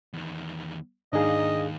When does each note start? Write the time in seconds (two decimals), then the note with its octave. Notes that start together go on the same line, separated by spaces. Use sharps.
0.13 E2 D#3
1.13 D#2 G#2 D4 D#4 G#4 D#5 F5